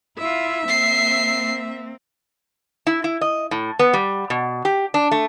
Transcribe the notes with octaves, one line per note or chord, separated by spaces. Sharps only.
E4 F4 E5
A#3 C4 C7
E4
E4
D#5
A2
B3
G3
B2
G4
D4
A3